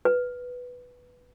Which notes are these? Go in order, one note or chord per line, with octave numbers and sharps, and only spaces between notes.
B4